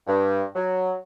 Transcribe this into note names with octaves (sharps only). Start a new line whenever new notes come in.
G2
F#3